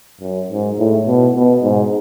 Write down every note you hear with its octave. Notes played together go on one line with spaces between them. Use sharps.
F#2
G#2
A2
B2
B2
G#2